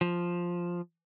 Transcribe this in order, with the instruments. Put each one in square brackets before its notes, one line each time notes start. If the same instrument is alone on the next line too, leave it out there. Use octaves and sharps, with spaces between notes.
[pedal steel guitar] F3